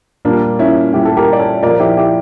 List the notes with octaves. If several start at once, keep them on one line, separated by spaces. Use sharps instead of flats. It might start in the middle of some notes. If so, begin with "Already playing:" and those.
A#2 G3 A#3 D4
C#4 E4
A#2 G3 E4 G4
A4
G4 A#4
D5
A4 C#5
A#2 F3 A#4 D5
E4 G4
E4 G4